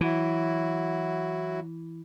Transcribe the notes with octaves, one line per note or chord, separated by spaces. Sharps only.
E3 F#3 E4 F#4